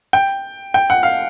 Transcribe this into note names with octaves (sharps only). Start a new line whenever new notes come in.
G5
G5
F#5
F5